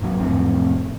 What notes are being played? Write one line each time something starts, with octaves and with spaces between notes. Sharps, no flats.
G#1 F#3
F1 F2 A2 C4